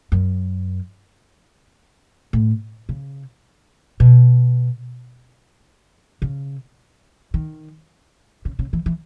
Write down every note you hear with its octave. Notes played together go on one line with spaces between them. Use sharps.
F#2
A2
C#3
B2
C#3
D#3
C#3
C#3
E3
E3